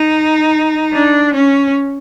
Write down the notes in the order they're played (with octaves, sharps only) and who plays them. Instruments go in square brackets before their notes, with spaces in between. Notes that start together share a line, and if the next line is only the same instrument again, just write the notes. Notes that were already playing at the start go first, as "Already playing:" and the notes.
Already playing: [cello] D#4
D4
C#4